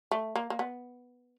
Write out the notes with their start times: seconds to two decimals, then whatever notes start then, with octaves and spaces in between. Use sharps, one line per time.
0.11 A3
0.36 A#3
0.50 A#3
0.59 B3